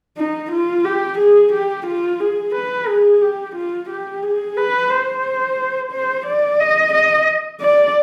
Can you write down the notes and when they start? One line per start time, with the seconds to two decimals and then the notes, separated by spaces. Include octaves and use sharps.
0.17 D#4
0.52 F4
0.85 G4
1.19 G#4
1.53 G4
1.87 F4
2.20 G#4
2.55 B4
2.88 G#4
3.21 G4
3.56 F4
3.89 G4
4.23 G#4
4.57 B4
4.91 C5
5.92 C5
6.26 D5
6.60 D#5
6.93 D#5
7.61 D5